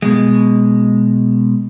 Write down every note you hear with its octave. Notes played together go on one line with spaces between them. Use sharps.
B2 G#3